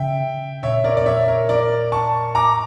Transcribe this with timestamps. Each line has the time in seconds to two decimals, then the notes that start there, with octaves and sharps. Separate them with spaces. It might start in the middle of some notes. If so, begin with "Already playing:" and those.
Already playing: C#3 E5 G5
0.63 A#2 C#5 E5
0.84 A#4 D5
0.97 D5
1.06 C#5 E5
1.28 A#4
1.49 A#4 D5
1.92 A5 C#6
2.35 A2 A#5 D6